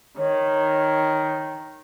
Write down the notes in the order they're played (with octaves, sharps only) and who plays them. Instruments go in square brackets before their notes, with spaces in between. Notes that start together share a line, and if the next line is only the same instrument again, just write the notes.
[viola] D#3 [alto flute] C#5